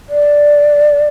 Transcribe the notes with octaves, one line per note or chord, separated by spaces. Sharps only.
D5